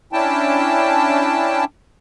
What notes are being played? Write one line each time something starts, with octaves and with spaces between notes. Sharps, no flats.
C#4 D4 E4 G5 A5